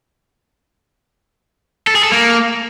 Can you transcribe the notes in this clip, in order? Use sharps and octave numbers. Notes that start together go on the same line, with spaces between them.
A4
G#4
A4
A#3